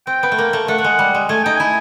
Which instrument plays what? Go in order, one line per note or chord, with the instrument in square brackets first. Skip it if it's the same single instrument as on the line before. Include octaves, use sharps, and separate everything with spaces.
[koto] C4 [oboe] G5
[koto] B3
A3
A#3
A3
[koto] A3 [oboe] F#5
[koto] A3
G#3
G3
G#3
[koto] A3 [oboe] G#5
[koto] D#4 [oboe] G5
[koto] E4 [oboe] G#5